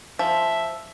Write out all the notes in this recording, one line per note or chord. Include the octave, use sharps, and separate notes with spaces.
F3 E5